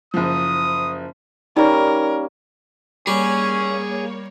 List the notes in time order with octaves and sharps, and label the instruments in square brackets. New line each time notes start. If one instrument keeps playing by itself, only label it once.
[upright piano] F#1 F3 [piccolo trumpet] D#6
[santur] G3 A#3 C#4 [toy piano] D#4 D5 [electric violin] A#4
[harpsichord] G3 [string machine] A#3 C#5 [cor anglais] C#4 [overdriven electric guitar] G#4